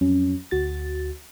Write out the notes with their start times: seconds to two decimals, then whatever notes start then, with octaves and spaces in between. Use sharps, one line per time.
0.01 F2 F#3 C#4
0.51 D2 F#4 A6